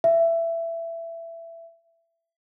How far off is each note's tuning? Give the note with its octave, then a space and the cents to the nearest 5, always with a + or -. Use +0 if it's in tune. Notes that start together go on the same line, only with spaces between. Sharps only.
E5 +15